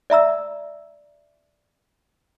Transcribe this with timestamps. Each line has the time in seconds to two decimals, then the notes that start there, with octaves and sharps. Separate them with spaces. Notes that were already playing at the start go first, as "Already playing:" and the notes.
0.10 D5 E5 A#5 E6